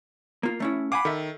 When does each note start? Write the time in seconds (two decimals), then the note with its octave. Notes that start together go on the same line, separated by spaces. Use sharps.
0.43 A#3 F4
0.60 A3 C#4 E4
0.92 F5 F#5 G#5 B5 D6
1.05 D#3 A4 E5